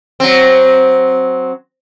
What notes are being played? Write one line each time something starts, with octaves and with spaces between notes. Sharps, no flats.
F#3 C4